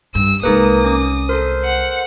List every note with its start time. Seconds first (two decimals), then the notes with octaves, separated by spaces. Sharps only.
0.15 G2 E6
0.43 C2 G#3 A#3 D#4 G#4 B4 D#6
0.85 C#4 D6
1.29 A4 A#4 C5
1.65 F#5